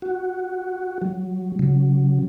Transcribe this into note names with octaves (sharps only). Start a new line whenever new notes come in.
F#4
F#3
C#3 F#3